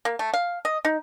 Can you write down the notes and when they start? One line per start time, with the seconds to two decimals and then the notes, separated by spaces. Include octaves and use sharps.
0.05 A#3
0.19 A3
0.34 F5
0.65 D#5
0.85 D#4